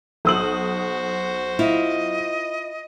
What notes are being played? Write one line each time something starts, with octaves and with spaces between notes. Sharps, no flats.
B1 F#4 C5 D#6 F#7
E4 F4 D#5